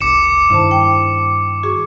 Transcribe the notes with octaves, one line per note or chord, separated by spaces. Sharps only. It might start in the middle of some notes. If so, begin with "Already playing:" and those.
F1 C2 D6 C#7 E7
G2 D#3 E4 C5 A5
G5
F#4 G#4 C#6